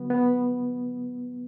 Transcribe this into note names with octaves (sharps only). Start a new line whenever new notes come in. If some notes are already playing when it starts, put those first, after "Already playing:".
Already playing: D3 F#3 B3
B3